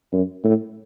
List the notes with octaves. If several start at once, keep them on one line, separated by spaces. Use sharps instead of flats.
F#2
A2